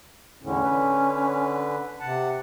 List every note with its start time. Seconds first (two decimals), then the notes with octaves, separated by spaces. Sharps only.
0.43 E2 A2 D3 C#4
0.63 D3 B4
2.00 C3 F#5 A5